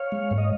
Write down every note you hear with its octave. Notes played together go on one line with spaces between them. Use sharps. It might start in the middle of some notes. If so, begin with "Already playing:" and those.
Already playing: C#5 F5
G#3
G#2
D#5